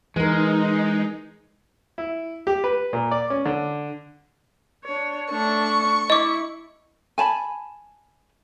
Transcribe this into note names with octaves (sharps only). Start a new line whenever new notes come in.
E3 G#3 D#4 A#4
E4
G4
B4
A#2
D5
C#4
D3
D4 C#5
A3 D4 C#6
E4 D#5 D6
G#5 A5 B5